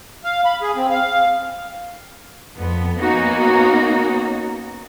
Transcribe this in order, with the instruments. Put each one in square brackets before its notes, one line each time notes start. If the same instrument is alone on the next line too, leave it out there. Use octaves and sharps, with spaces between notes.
[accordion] F5
B5
G#4
C4
F5
[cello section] F2 B3
A#3 B3 C#4 D#4 F#4